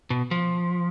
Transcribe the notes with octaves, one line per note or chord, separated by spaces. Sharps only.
B2
F3